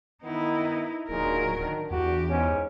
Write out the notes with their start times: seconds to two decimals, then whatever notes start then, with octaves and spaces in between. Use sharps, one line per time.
0.24 D#3 B3 D#4 E4
1.09 D1 A#2 F#3 D#4 G#4 A#4
1.59 D#3 D4
1.91 E2 D4 F#4 G4
2.28 G#2 C#4